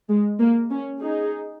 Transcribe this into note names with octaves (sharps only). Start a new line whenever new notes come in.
G#3
A#3
C#4
D#4 G#4